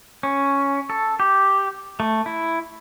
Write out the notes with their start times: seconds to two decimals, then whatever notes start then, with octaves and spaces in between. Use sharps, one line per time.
0.23 C#4
0.90 A4
1.20 G4
2.00 A3
2.26 E4